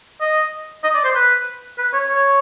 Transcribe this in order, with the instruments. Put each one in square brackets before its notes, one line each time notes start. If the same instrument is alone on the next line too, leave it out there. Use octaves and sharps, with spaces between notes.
[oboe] D#5
D#5
D5
C5
B4
B4
C#5
C#5